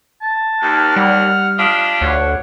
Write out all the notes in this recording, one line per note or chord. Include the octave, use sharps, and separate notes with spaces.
A5
D#2 F6
G3 F#5
D4 F4 G4 D#5
D2 C#5 F#5